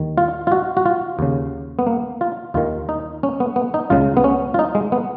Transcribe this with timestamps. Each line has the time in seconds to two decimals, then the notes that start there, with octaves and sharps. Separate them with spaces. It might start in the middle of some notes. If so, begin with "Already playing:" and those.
Already playing: D#2 D#3
0.18 F4
0.47 F4
0.52 F#4
0.77 F#4
0.86 F4
1.19 D#2 C#3
1.79 B3
1.87 A#3
2.21 F4
2.54 D#2 D#3 F4
2.89 D#4
3.23 C#4
3.40 B3
3.56 B3
3.74 D#4
3.90 C#2 C#3 F4
4.17 B3
4.24 C#4
4.54 F4
4.59 D#4
4.75 G#3
4.92 B3